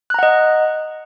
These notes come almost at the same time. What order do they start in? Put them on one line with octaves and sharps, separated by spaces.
F#6 A#5 F#5 D#5